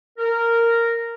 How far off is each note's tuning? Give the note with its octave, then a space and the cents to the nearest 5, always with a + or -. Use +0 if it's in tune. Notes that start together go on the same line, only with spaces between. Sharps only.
A#4 -10